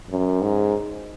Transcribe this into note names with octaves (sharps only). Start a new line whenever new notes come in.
F#2
G#2